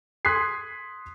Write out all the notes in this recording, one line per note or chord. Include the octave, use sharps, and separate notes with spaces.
C6 D#6 F#6 G#6 B6 C7